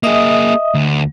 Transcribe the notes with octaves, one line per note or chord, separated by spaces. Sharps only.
A#3 G#4 D#5 E5 D#6
D2